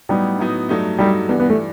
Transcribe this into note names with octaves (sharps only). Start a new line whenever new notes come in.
A2 F#3 G3 B3 D#4
A2 F#3 B3 D#4
G2 F#3 A3 D#4
G2 F#3 G3 A3 D#4
G2 E3 G3 B3
B3
A3